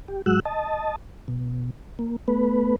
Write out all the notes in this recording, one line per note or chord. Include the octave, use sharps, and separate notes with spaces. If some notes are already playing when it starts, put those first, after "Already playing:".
G4
G#2 F#3 G#3 F#4 E6 F#6
D#5 A5
B2
A#3
A3 B3 B4